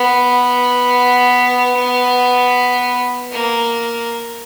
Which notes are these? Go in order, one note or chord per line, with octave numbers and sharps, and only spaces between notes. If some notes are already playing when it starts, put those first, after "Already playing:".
Already playing: B3
A#3